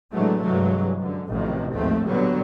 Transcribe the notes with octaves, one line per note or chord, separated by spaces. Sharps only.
A2 D3 E3 F#3 G#3 A3
G2 C3 E3 F#3 G#3
F#2 D3
A1 F2 A2 C3 D#3 F#3
D#2 G#2 F3 A3 C4
A#2 D3 F#3 G3 B3